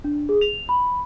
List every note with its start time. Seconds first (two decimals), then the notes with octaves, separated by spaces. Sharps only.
0.04 D4
0.29 G#4
0.41 F7
0.69 B5